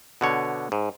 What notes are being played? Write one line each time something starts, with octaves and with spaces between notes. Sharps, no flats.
B2 D3 C#5
G#2